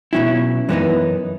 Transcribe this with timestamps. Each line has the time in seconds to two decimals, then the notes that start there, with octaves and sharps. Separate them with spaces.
0.13 B2 F#3 C#4 E4
0.69 F#2 E3 G#3 B3 D#4